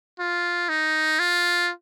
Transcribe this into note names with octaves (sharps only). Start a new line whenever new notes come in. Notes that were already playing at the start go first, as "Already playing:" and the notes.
F4
D#4
F4